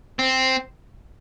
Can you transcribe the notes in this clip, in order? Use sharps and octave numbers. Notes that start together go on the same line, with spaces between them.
C4